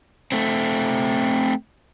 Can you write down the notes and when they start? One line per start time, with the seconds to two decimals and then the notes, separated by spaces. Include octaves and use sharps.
0.32 A3 C4